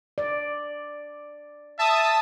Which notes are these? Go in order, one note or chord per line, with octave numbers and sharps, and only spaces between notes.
D5
E5 A5 D#6